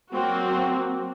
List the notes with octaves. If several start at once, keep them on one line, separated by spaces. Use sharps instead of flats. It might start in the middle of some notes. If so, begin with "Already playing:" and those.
F#3 A#3 C4 F#4